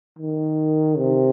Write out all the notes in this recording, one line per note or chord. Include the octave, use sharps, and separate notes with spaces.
D#3
C3